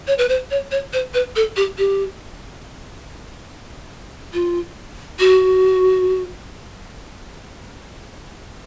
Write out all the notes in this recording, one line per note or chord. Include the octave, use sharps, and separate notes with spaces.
C#5
B4
C5
C#5
C#5
C5
B4
A4
G4
G4
F4
F#4